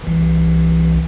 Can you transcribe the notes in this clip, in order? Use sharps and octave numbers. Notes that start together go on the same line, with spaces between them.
C2 E3